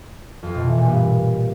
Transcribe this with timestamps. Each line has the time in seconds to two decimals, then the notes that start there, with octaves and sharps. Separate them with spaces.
0.43 F2
0.54 B2
0.66 E3
0.78 A#2
0.89 G2